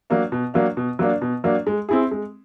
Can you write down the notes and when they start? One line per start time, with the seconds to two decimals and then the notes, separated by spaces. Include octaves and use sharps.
0.10 F#3 A#3 D4
0.32 B2
0.54 F#3 A#3 D4
0.77 B2
0.99 F#3 A#3 D4
1.21 B2
1.44 F#3 A#3 D4
1.67 G#3
1.89 C4 E4 G#4
2.11 G#3